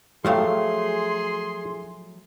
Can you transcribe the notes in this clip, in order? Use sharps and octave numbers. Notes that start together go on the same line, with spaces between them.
F3 F#3 A3 G4 G#4 F5 C6